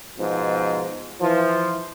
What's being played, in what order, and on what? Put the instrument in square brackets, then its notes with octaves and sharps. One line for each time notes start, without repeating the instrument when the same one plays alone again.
[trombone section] G#2 B2 F3
E3 F3